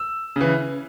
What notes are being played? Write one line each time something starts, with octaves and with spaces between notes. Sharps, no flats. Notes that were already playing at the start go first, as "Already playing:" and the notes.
Already playing: E6
C#3 E3